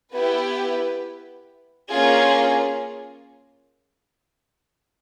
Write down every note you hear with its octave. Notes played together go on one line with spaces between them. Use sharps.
B3 E4 G4 B4
A#3 C#4 F4 G#4